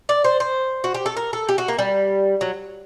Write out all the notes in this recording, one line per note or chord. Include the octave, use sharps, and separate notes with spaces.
D5
C5
C5
F#4
G4
A4
A#4
A4
G4
F#4
A#3
G3
F#3